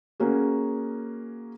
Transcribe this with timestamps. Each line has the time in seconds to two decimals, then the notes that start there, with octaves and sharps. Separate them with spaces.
0.20 A#3 C#4 F#4 G#4